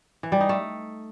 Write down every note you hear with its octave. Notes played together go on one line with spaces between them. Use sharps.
E3
G3
D#4
A3